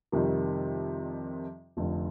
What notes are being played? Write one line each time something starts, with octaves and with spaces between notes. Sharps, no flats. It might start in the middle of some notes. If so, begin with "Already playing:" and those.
F2 C3 D#3 G3
F1 F2 D3